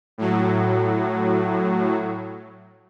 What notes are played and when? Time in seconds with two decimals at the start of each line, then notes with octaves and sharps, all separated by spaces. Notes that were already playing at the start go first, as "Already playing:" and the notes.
0.18 A2 F#3